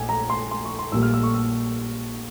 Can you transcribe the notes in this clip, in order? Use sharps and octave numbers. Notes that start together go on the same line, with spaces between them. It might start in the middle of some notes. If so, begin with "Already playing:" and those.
Already playing: A#1 G#5
A#5
C6
C6
C#6
C6
A#1 A#2 G3 A#3 E6
F6
E6
C#6
E6